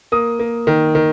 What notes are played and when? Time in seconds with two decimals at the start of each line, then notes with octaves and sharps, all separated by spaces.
0.12 A#3 D#6
0.39 A#3
0.67 D#3
0.95 D#3